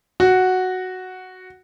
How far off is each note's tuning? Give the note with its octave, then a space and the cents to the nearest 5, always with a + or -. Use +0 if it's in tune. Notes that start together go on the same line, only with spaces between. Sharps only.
F#4 +0 F#5 +0